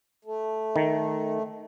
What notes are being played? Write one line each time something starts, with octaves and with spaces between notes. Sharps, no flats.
A3
D#3